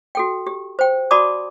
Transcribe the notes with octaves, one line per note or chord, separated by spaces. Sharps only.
F#4 A4 G5
G4
C5 G5
F#4 D5 A5 B5 D6 D#6